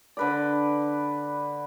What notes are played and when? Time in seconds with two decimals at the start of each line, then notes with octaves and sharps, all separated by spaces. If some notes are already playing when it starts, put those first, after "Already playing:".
0.17 D3 B4 D5